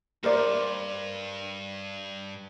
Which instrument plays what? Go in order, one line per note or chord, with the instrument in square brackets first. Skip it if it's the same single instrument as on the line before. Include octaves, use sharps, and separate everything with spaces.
[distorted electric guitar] G2 [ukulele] A#4 C5 D5